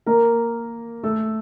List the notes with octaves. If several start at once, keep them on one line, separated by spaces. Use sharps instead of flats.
A#3 A#4
A3 A4